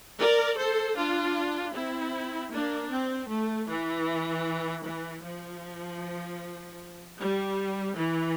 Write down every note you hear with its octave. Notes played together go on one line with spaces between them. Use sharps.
A#4 D5
A4 C5
D4 F4
C4 E4
A#3 D4
C4
A3
E3
E3
F3
G3
E3